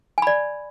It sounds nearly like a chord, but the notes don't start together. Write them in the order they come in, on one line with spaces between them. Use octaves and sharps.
G#5 B5 D5